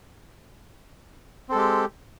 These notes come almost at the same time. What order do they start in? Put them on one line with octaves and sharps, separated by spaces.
C4 A4 G#3 G4